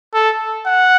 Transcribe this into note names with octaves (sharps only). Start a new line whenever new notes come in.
A4
F#5